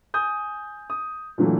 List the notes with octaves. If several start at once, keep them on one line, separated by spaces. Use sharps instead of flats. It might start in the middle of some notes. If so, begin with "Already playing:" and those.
G#5 D#6 G6
D#6
A#2 D3 E3 F#3 A3